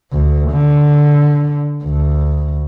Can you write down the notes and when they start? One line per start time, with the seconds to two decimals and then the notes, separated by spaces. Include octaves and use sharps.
0.12 D2
0.52 D3
1.85 D2